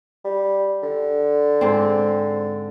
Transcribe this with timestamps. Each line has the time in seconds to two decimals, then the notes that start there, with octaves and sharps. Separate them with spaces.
0.25 G3
0.83 D3
1.61 G#2 C4